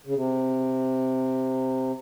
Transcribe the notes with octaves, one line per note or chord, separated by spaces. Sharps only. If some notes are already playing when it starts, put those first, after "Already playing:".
C#3
C3